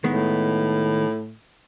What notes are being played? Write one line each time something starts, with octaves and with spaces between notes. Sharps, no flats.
A2 D#3 G#3 B3